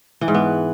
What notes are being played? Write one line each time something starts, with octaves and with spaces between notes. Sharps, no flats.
E3
G#2
B3